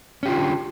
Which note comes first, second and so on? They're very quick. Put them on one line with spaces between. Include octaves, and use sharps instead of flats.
C#4 G4 F4 D3